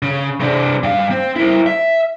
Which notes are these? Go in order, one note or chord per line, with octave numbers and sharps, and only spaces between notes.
C#3
C3 D4
G2 F5
C4
E4 A#4
E5